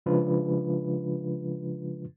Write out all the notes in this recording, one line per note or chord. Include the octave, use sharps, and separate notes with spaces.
C#3 F3 G#3 D4 F4 B4